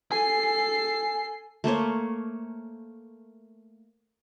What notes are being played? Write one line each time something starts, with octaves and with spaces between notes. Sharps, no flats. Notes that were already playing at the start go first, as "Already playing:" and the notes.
A4 G#5 C7
A3 A#3 C5 C#5